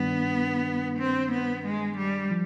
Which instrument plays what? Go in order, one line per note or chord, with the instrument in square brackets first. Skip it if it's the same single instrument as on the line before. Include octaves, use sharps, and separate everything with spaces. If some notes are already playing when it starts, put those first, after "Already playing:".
Already playing: [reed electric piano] G2 D#3 G3 D4 [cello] B3
[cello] C4
B3
G#3
G3
[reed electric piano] F3